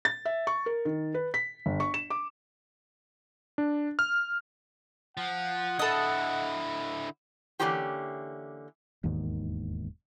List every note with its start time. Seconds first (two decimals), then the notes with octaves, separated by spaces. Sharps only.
0.05 A6
0.25 E5
0.47 C#6
0.66 A#4
0.85 D#3
1.14 B4
1.34 B6
1.66 G1
1.80 C#6
1.94 E7
2.10 D6
3.58 D4
3.99 F6
5.17 F3 F#5
5.79 D3 E4 A4 D#5
7.59 D3 E3 A#3 C#4 F4 G4
9.03 E1 D#2 G#2 D#3